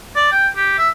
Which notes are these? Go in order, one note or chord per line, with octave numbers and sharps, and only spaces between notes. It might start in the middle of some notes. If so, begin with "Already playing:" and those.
D5
G5
G4
E5